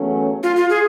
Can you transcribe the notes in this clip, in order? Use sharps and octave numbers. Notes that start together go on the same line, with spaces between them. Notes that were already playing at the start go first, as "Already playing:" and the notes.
Already playing: E2 C#3 F#3 A3 C#4
F4
F4
G#4